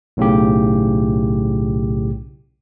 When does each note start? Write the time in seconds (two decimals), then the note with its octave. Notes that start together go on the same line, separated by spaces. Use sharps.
0.17 B1 A2 C#3 G4